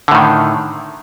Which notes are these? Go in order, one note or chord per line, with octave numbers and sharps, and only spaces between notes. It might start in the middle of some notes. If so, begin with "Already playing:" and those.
A2 D3 D#3